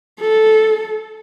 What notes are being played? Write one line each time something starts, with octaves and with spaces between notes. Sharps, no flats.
A4